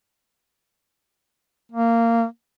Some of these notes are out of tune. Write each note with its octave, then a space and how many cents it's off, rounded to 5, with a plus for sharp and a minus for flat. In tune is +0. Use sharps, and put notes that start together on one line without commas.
A#3 -15